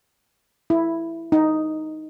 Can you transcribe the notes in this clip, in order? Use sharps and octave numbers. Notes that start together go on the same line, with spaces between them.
E4
D#4